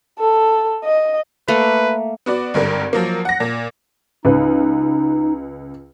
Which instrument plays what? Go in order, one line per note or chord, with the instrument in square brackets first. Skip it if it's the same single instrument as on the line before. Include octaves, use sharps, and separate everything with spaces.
[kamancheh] A4
D#5
[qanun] A3 A#3 [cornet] B4
[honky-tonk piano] B3 F#4 D5
G#1 G2 D3 A#4
F3 F#3 A#3
F#5 A#6
A#2
[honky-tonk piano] C#2 B4 [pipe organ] D#4